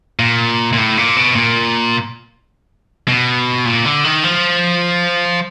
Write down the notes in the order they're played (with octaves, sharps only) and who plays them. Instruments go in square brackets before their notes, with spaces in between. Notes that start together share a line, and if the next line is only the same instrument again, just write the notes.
[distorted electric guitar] A#2
A#2
A2
A#2
B2
A#2
B2
A#2
D3
D#3
F3